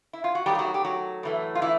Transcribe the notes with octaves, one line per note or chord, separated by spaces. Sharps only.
E4
F4
F#4
D#3 F#3 G3 A3 G4
F4
F#3 F#4
G4
F#3 F#4
A2 E3 A3
F4
E3 E4